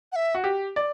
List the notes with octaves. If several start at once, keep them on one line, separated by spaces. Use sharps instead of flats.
F#5
E5
F#4
G4
D5